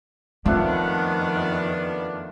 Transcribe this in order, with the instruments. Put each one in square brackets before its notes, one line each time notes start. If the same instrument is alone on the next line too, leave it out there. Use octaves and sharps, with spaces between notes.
[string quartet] F2 D#3 [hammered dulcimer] F3 A3 F#5 [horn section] B3 D4 [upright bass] C4